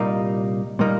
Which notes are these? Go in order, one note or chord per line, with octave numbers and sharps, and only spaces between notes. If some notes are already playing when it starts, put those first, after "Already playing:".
Already playing: C2 A#2 G3 A#3 D#4
A#2 G3 A#3 D#4